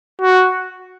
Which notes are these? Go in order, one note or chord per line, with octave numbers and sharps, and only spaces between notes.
F#4